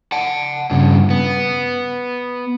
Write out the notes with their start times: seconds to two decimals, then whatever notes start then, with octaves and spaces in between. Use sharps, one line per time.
0.12 F#5 A5
0.71 G2 C#3
1.10 B3